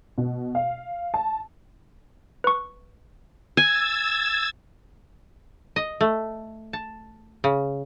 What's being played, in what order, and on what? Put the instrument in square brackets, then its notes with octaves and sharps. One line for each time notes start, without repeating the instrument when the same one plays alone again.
[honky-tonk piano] B2
F5
A5
[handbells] B4 C#6
[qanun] G#5 [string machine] E6 G#6 A6
[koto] D#5
A3
A5
C#3